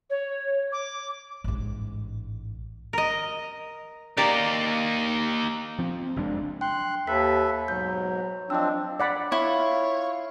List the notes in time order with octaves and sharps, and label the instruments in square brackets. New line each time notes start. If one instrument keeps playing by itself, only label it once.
[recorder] C#5
D6
[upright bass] A1 G#2
[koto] A#4 D#5
[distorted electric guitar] A#3 D#4 [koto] G4 A#4 D5
[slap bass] F3 C4
F#1 F2 G#3 D4
[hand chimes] G5 [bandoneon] C6 F#6
[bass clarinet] D#2 [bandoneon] A4 B4 E5 [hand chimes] B6
[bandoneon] G#2 B2 [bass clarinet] F#3 [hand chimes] G6
[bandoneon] F3 C4 [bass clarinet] D4 [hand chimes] D#5 E6
[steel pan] D5 F#5 B5
[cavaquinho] E4 [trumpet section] F4 F5 [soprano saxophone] C#5